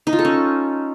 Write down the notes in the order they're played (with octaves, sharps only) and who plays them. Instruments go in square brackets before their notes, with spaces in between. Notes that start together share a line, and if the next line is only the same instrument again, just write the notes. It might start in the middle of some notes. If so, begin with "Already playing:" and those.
[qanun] D#4
F4
A4
C#4